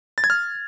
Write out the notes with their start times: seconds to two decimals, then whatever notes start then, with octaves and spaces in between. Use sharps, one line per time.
0.18 A6
0.24 G#6
0.30 F6